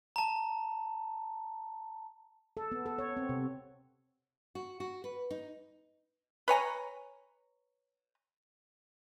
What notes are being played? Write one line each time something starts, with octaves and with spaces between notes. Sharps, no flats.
A5 A#5
A4
B3
A4
C#5
C4
C3
F#4
F#4
B4
D#4
B4 C#5 G#5 A#5